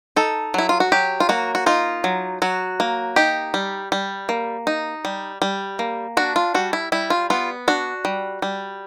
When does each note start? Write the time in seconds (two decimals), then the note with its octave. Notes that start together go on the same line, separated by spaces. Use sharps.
0.16 D#4 A4
0.54 F#3 E4
0.69 F4
0.80 F#4
0.92 F#3 G4
1.20 F4
1.29 A#3 F#4
1.55 F#4
1.66 D#4 F4
2.04 F#3
2.42 F#3 F#4
2.80 A#3
3.16 D#4 G4
3.54 G3
3.92 G3
4.29 A#3
4.67 D#4
5.05 G3
5.42 G3
5.79 A#3
6.17 D4 F#4
6.36 F4
6.54 G3 F#4
6.73 E4
6.92 G3 E4
7.10 F4
7.30 B3 F4
7.68 D4 F#4
8.05 G3
8.42 G3